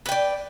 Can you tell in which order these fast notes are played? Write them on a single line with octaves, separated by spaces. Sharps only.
B4 G5 D5